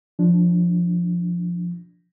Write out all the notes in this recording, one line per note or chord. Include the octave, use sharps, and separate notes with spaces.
F3 D4